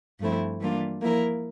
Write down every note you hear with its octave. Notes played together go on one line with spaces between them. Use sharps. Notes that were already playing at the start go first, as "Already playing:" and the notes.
G2 F3 A3 C4 E4
E3 G3 A#3 D4 F4
F3 A#3 E4 A#4